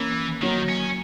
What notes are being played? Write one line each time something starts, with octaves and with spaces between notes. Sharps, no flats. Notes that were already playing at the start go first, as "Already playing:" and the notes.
Already playing: E3 A#3 C#4
D#3 F#3 A#3
C#4